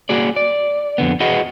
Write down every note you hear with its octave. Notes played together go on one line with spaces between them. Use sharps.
A#3 F#4 G#4 D5
D5
F2 D3 B3
F#4 G#4 B4 D#5 F#5